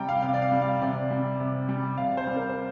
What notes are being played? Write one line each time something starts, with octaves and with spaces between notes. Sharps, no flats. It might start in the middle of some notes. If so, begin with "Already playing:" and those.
Already playing: C3 G3 G5 A#5
F5
C3 F5
D5
F5
G3
F5
C3 D5
G3
C3
G3
C3 F5
C5
G3
A#4
C5